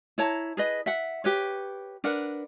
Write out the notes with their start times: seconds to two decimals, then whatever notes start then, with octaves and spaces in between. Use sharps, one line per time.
0.18 E4 C#5 A5 A#5
0.57 G#4 B4 D#5
0.86 E5 F#5
1.24 G4 B4 C#5
2.04 D4 A#4 B4 F#5